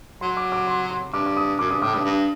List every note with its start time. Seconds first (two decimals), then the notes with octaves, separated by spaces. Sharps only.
0.21 F#3 C6
0.37 D6
0.52 D6
0.67 C6
0.91 C6
1.13 G2 D6
1.26 D6
1.37 D#6
1.59 F#2 D6
1.71 G2 D#6
1.82 A2 D6
1.93 G2 D#6
2.05 G2